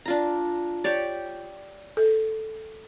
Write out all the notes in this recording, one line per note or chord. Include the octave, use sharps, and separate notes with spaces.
D4 F4 A#5
G4 C#5 D5
A4